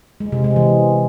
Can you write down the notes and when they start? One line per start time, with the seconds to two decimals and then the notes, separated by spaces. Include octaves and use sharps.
0.20 G#3
0.32 C3
0.44 G#3
0.56 E3